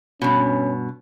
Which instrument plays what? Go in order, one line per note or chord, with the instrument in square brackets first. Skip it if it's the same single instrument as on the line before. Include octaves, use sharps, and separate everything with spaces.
[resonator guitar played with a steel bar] G2 B2 [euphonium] C#4